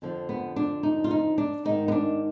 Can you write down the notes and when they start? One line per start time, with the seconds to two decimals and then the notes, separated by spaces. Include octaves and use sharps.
0.02 F2 D3 F3
0.29 B3
0.56 D4
0.83 D#4
1.04 F4
1.11 D#4
1.38 D4
1.65 G#2 D#3 D#4
1.88 B3
1.92 D4